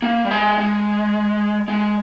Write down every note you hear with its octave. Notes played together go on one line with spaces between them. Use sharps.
A#3
G3
G#3
G#3
G#3